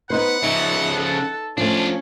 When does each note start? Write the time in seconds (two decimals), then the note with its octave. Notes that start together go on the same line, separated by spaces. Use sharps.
0.10 B3 D#4 B4 C5 F#5
0.44 C#3 F3 D#4 E5
0.96 A4
1.58 F3 A3 C#4 D4 F4